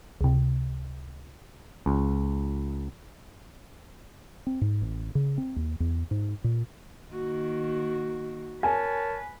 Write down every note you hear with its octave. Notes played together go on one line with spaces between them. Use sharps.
C#2 C3
C#2
C4
G#2
A1
C#3
C4
D#2
E2
G#2
A#2
D#3 A#3 F#4
A#4 B4 C#5 G#5 A5